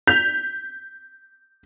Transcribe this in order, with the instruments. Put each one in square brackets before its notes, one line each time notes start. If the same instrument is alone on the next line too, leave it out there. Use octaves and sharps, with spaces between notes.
[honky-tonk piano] G6 B6 F7